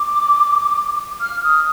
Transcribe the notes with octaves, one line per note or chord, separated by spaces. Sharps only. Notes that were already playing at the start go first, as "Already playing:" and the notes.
Already playing: D6
F6
D#6